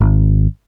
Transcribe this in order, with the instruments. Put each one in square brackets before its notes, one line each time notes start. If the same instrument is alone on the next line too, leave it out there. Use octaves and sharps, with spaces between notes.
[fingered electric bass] G#1